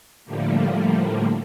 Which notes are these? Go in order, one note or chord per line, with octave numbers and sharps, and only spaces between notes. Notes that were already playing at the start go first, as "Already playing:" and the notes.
A2 D3 F3 G3 A3 A#3